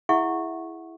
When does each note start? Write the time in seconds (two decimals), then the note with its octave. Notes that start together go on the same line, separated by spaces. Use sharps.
0.09 E4 G#4 E5 F#5 C#6